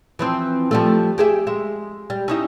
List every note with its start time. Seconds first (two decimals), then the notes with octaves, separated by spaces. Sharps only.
0.19 E3 F3 C4
0.71 F3 G3 A3
1.18 G4 G#4 E5
1.47 G#3 E5
2.10 G3
2.28 C#4 D#4 E4